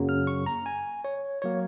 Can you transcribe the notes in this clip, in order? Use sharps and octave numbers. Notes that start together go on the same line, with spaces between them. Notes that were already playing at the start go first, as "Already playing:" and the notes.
Already playing: F#2 C#3 F#3 A#3
F6
C#6
A#5
G#5
C#5
F#3 A#3 C#5